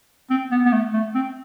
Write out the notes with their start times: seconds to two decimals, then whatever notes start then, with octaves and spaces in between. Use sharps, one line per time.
0.30 C4
0.52 B3
0.66 B3
0.72 A3
0.94 A3
1.15 C4